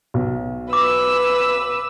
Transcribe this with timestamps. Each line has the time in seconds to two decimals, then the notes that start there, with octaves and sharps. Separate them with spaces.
0.14 B1 F#3 B3
0.73 B4 D6 E6